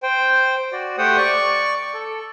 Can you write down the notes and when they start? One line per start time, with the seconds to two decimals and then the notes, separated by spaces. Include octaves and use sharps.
0.03 C5 G5
0.72 F#4 D5
0.98 A3 G4 C5 F#5 G5 D#6
1.17 D5 C#6
1.94 A4